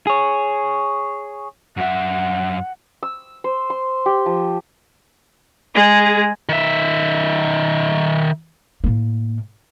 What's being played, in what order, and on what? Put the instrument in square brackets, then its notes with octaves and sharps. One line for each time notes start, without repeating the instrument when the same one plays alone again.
[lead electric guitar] G#4 C#5
[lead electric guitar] F#2 E5 [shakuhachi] F#5
[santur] E6
C5
C6
G4
F3
[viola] G#3 G#4
[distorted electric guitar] D#3 E5
[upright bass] A2 A#3